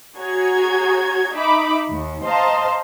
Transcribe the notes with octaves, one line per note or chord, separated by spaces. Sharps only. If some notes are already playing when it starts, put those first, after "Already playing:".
F#4 G#4 C#5 A#5 G#6
D#4 E5 B5 D6
D#2
C5 D#5 F5 A5 A#5 C6